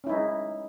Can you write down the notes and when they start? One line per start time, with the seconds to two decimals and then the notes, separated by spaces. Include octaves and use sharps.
0.04 C#4
0.07 E4
0.09 D#4
0.12 G#3